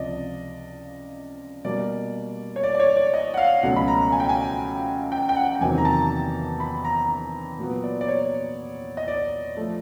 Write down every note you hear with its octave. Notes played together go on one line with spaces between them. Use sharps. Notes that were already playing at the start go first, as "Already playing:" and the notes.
Already playing: C#2 C3 F3 D5 D#5
B2 G3 A#3 D5
C#5
D5
D5
C#5
D5
D#5
F#5
F5
C#2 B2 F#3 A3 C#4 F#5
B5
A#5
G#5
G5
G#5
G5
G5
F#5
G5
E2 C3 D#3 F#3 A#3 G#5
A#5
A5
B5
A#5
A#2 F#3 B3
D5
D5
C#5
D#5
D5
F3 A3